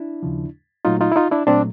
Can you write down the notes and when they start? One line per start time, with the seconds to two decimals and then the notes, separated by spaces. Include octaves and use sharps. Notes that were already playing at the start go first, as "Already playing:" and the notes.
Already playing: D4 E4
0.23 D#2 C#3 F3
0.85 A#2 F#3 A3 D#4 F4
1.01 D#4 F4
1.12 E4
1.16 D#4 F4
1.31 D4 E4
1.47 A#2 F#3 A3 C4 D4